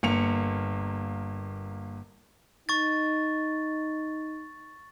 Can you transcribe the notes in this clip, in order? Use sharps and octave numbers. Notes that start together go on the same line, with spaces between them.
G1 A#3 C#7 F7
D#4 C#6 A6